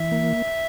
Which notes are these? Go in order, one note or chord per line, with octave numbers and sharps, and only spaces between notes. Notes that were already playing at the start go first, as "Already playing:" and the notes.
Already playing: E3 E5
A#3